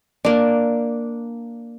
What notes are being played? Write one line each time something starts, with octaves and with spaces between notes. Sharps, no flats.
A#3 D4